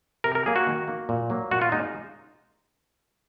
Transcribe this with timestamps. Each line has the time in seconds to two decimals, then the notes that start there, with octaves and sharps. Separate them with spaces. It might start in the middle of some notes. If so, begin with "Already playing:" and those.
0.24 C3 A#4
0.35 A#4
0.46 F#3 A#3 G#4
0.56 F#4
0.67 D#3
0.88 A#3
1.09 A#2
1.30 F#3 A#3
1.51 A#2 F#4
1.61 F4
1.72 G#3 D#4